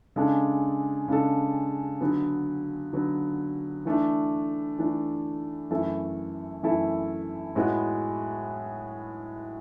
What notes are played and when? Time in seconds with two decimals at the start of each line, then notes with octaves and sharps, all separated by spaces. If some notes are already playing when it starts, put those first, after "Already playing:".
0.16 C#3 G#3 D4 A4
1.08 C#3 G#3 D4 A4
2.00 D3 F#3 B3
2.93 D3 F#3 B3
3.85 E3 A3 D4
4.78 E3 A3 D4
5.70 F#2 E3 A3 E4 A4
6.63 F#2 E3 A3 E4 A4
7.55 A2 G#3 B3 F#4